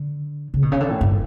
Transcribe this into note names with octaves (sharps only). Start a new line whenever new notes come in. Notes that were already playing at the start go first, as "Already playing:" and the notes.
Already playing: D3
C#3
B2
C#3
D3
A2
G2